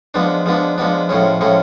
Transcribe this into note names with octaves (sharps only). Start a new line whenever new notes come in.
F3 G#3 B3 D4
F3 G#3 B3 D4
F3 G#3 B3 D4
A2 F3 G#3 C#4
A2 F3 G#3 C#4